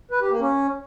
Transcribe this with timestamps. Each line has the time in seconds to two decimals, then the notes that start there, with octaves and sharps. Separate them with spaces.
0.11 B4
0.21 G4
0.31 A#3
0.40 C#4